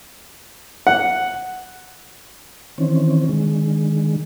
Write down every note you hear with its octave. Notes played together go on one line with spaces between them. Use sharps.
F#5
D#3 E3 C4 C#4
D3 D#3 G#3